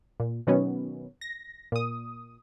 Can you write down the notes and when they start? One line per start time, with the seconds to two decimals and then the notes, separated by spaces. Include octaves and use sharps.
0.20 A#2
0.47 B2 D#3 F#3 B3 C#4
1.21 A#6
1.72 A#2 D#6